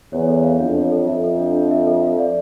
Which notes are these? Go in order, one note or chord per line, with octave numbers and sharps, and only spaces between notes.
E2 C#5
A4
F5
F2 D4
C#5
A4
F2 E5
A4
D4
D4
E5
A4
F5
D5